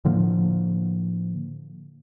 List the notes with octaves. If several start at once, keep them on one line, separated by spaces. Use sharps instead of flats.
A2 D3 F3 A#3